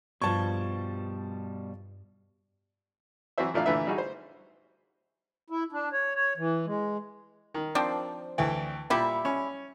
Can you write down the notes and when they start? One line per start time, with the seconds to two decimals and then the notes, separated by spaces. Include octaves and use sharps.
0.22 G2 B2 F3 G3 A5 C#6 G#6
3.38 E3 F#3 C4 F#4 C5 E5
3.54 A#2 F3 A3 D4 E4 F5
3.66 A#2 D3 E3 A3 B4 E5
3.87 G3 D#4 E4 F#4 G#4
3.98 C5
5.50 E4
5.72 D4
5.93 C#5
6.15 C#5
6.37 E3
6.66 G#3
7.54 D#3
7.75 F3 C4 D4
8.38 D2 E3 G5
8.90 A#2 G3 E4
9.25 C#4